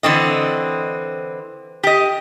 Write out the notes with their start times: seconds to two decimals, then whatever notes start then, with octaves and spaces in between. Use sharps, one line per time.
0.03 D3 E3 C4 D#5
1.83 G4 D#5